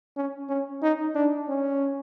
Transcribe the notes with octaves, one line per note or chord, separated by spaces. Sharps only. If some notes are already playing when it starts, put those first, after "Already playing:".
C#4
C#4
D#4
D4
C#4